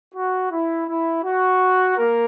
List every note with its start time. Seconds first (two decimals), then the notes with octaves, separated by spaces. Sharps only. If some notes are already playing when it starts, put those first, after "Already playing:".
0.15 F#4
0.51 E4
0.87 E4
1.23 F#4
1.97 A#3 A#4